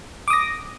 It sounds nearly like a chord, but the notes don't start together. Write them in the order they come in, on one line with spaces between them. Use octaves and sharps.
D6 D#6 A#6